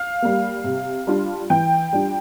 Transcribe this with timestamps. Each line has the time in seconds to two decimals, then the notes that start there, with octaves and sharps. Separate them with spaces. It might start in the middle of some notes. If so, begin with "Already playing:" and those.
Already playing: F5
0.22 G3 A#3
0.64 C3
1.07 G3 D4 F4
1.50 E3 G5
1.93 G3 D4 F4